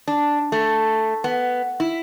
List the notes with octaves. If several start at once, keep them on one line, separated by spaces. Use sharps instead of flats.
D4
A3
B3
E4